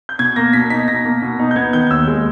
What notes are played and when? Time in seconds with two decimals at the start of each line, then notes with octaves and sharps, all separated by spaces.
0.09 G6
0.19 B2 G#6
0.36 A#3 A#6
0.53 B2 B6
0.70 D#4 B6
0.88 B2 A#6
1.05 A#3
1.22 B2
1.39 D#4
1.51 G6
1.56 B3 G#6
1.73 D#3 G6
1.90 D#2 E6
2.07 G#3